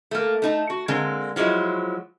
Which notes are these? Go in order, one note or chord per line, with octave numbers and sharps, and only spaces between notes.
A3 A#3
A3 D#4 A5
F#4
D3 G#3 A#3 C4
F3 F#3 G#3 E4